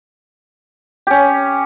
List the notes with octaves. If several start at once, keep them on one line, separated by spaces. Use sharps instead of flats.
C#4 G4